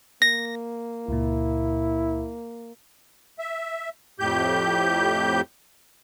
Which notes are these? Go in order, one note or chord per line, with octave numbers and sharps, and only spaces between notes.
A#3 A#6
C#2 A#2 E4
E5
F2 A2 G4 G6